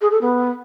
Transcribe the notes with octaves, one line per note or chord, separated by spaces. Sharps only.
G#4
A4
B3